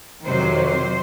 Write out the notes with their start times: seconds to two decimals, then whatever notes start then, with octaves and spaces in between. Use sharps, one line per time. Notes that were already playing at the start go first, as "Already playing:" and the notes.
0.24 F2 C3 D#3 F#3 C5
0.68 C5